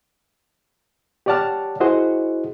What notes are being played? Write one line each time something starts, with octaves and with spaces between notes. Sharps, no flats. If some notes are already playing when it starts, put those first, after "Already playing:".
G4 C#5 D5 F#5 A5 F6
E4 F#4 G#4 C5 D#5 F#5